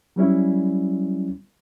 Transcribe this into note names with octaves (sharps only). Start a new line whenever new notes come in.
F#3 G3 C#4 E4